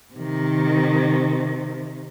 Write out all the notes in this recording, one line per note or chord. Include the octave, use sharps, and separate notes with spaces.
C3 D#3